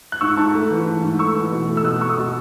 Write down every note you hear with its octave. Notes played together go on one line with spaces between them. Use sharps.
F#6
G#2 C#6 E6
G#2 A5 C#6
A3
E3
G#2
G#2
A3 C#6 E6
E3
B2
A3
E6
B2 D#6 F#6
A3 C#6 E6
D#6
B2 C#6 E6